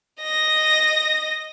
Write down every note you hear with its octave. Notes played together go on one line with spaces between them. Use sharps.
D#5 A#6